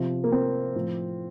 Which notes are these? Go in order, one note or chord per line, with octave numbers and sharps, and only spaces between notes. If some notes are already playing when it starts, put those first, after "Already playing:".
Already playing: C3 F3
A#3
C4
A2 F3